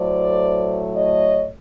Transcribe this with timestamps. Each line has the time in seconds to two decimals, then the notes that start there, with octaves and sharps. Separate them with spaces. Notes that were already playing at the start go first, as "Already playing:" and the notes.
Already playing: A2 F#3 A3 C5 D5
0.95 C#5 D#5